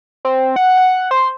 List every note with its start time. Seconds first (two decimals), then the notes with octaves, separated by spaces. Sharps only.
0.25 C4
0.56 F#5
0.77 F#5
1.11 C5